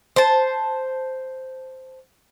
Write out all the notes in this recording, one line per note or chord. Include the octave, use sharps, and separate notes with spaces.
C5 A5